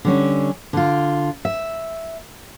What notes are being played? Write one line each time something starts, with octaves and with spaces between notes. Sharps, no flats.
D3 G3 C#4
D3 F4
E5